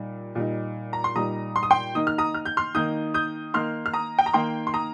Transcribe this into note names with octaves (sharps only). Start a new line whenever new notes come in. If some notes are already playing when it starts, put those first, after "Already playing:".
Already playing: A#2 G3 D#4
A#2 G3 D#4
A#5
C6
A#2 G3 D#4 A#5 D#6
C6
D#6
G5 C6
D#3 A#3 D#4 D#6
F6
A#5 D#6
F6
G6
C6 F6
D#3 A#3 D#4 D#6 G6
D#6 G6
D#3 A#3 D#4 C6 F6
F6
A#5 D#6
G5
A#5
D#3 A#3 D#4 G5 C6
C6
A#5 D#6